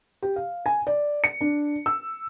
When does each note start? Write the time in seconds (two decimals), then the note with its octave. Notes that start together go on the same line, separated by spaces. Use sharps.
0.22 G4
0.36 F5
0.66 G#5
0.87 D5
1.24 C#7
1.41 D4
1.86 E6